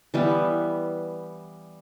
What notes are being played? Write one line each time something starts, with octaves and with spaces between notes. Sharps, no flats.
E3 G3 B3